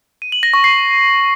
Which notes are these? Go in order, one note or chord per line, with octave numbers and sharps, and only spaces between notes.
D#7
F#7
A#6
C#6
C7